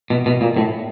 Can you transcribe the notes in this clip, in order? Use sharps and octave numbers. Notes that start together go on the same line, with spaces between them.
B2
B2
A#2
A2